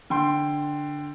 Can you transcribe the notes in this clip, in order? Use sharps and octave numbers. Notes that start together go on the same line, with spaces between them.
D3 G5 C6